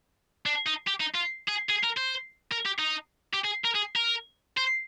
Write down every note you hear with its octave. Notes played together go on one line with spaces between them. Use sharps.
D4
D#4
G4
D#4
F4
G#4
G#4
A#4
C5
A#4
G4
D#4
G4
G#4
A#4
G#4
A#4
C5